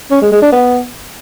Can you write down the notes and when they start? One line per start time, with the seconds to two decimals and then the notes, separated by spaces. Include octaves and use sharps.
0.11 C#4
0.21 G#3
0.32 G#3
0.42 D4
0.52 B3